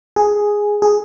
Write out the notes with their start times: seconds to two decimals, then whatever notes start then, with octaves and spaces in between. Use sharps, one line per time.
0.16 G#4
0.82 G#4